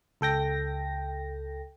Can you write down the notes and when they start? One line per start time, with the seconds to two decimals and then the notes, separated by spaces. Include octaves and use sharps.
0.21 C#2 A4 G5 A#6